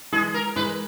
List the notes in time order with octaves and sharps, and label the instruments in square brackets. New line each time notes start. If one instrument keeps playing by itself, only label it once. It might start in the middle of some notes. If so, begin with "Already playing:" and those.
[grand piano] E3 G#3 [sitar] G#4
[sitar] A#4
[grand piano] E3 G#3 [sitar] B4